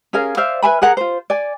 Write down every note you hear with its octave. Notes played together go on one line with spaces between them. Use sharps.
C#4 G#4 A#4 F5
C5 D5 E5 F5
B4 E5 G#5 B5
G#4 A#4 F#5 A#5
F4 C5
D5 G#5